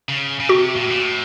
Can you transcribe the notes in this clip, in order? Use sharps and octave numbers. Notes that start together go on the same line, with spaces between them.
C#3
C#3
C3 F#4
A#2
A2
A#2
A2